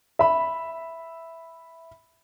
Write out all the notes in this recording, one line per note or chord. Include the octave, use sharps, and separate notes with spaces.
E5 B5